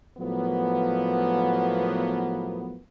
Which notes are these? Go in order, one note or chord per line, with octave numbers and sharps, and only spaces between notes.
A2 F3 F#3 A#3 B3